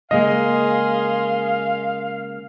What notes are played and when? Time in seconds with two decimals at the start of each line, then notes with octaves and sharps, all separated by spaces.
0.11 C#3 G#3 A#3 G#4 D#5 F5 C6